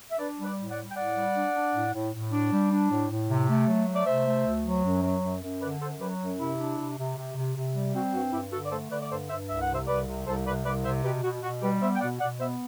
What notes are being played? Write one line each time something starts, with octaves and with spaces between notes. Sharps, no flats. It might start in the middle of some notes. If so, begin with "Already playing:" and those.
E5
D4 B4 D5
G3
B4 D5
A2
D5 F#5
G3
G5
A2 D5 F#5
G3
D4
D4
A2
A2
A2
D4
G3
D4
A2
A2
C3
A3
F#3
A3
D5
C3 C5 E5
A3
D2
F#3
F#2
F#3
F#2
F#2
D3 B4 D5
F#2 A4 C5
F#3 G4 B4
F#2
C3 E4
D4
C3
C3
C3
C3
C3
G3
C4 F#4
G2 F#4
G2 E4 G4
D3 F#4 A4
D5
A3 A4 C5
D3 B4 D5
D5
G2 A4 C5
G2 C5 E5
C2 E5
F#5
C3 C5 E5
C2 B4 D5
C3
C2 A4 C5
C3 B4 D5
C2 B4 D5
C3 C5 E5
B2 G4 B4
B2 F#4
B2 F#4
G3 G4 B4
B3 C5 E5
G5
B2 D5 F#5
B2 D5 F#5
B3 C5 E5